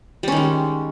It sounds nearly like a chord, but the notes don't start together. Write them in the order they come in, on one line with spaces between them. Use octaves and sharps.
G3 C#4 D#3 G#3